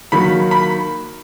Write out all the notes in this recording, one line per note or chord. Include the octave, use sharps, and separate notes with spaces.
D#3 F#3 A#3 B5
B5